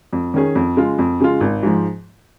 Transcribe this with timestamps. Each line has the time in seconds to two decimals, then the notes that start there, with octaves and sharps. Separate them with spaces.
0.13 F2
0.34 D#3 C#4 G#4
0.55 F2
0.77 C#3 G#3 F4
0.99 F2
1.20 C#3 G#3 F4
1.41 G#1
1.63 G#2 F3